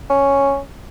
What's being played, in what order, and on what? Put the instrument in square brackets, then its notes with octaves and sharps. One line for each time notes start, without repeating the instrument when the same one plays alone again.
[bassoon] C#4